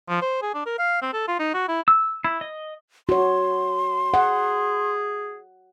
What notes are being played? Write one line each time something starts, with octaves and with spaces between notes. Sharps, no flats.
F3
C5
G#4
D4
A#4
F5
C4
A4
F4
D#4
F#4
E4
E6
E4
D#5
F#4 C#5 C6
G#4 F#5